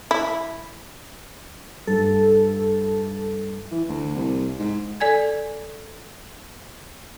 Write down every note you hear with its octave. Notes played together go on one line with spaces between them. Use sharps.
E4
G2 A4
E3
D2
C2
G#2
A4 D5 G#5 G#6